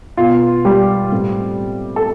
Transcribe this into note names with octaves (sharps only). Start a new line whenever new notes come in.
B2 B3 F4
G3 G4
A2 G3 C4
A4